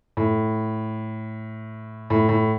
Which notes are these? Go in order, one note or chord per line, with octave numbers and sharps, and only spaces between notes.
A2
A2
A2